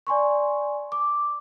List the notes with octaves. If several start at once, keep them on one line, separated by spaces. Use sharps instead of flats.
D5 G#5 C6 C#6
D6